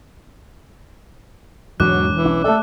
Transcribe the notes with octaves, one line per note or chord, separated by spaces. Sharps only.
E1 E2 G#2 E3 F#3 D6 F#6
E3
B1 C#4 D4
A3 A4 D5